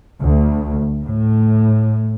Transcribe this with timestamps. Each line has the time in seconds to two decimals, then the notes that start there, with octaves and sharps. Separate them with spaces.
0.21 D2
1.03 A2